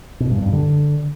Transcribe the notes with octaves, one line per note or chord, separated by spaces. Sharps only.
B2
G2
G2
D3